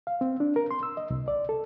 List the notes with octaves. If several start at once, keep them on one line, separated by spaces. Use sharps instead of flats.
F5
C4
D4
A#4
C6
E6
D#5
C2
D5
A4